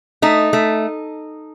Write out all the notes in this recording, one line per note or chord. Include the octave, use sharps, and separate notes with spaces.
A3 D#4
A3